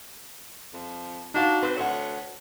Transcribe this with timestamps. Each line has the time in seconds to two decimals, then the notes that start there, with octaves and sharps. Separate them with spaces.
0.73 F2
1.34 D4 D#4 F#4 F5
1.63 C4 B4 C6
1.76 D2 C#5 F#5